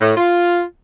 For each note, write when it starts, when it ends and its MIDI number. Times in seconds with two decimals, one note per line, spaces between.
0.01 0.12 45
0.17 0.61 65